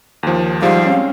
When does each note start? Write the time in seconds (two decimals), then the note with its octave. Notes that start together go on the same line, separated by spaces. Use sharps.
0.23 D#2 F3
0.62 G#2 F3 G3 F5
0.86 C4 C#4